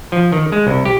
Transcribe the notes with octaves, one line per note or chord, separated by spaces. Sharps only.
F3
D#3
G#3
C2
G4